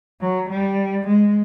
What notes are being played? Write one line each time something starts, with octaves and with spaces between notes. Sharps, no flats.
F#3
G3
G#3